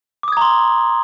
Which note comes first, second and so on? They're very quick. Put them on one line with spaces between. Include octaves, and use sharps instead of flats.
D6 D#6 G#6 A#5 C6